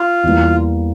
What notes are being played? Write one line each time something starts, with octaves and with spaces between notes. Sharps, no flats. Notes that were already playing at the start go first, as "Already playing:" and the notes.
Already playing: F4
E2 E3 G3 A#3